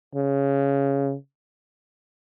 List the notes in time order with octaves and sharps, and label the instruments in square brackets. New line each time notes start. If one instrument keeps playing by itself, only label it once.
[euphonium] C#3